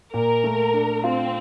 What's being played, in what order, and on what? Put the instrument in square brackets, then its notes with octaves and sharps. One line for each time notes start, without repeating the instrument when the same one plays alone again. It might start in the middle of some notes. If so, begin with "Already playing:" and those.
[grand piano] A#2 [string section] A#4
[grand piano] A3
D4
[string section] C4 [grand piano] F4